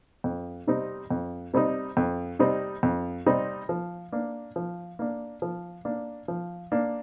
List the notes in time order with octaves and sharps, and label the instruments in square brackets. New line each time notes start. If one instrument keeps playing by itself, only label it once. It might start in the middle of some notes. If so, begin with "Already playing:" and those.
[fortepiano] F2
C3 G3 C4 D#4
F2
C3 G3 C4 D#4
F2
C3 G3 C4 D#4
F2
C3 G3 C4 D#4
F3
A#3 D4
F3
A#3 D4
F3
A#3 D4
F3
A#3 D4